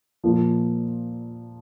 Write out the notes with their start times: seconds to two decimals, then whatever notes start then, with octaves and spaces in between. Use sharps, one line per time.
0.24 A#2 F3 A#3